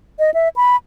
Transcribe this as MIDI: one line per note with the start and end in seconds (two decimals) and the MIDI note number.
0.19 0.31 75
0.34 0.49 76
0.56 0.76 83